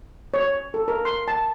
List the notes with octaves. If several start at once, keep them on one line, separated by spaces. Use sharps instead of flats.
C#5
A4
A#4
C6
A5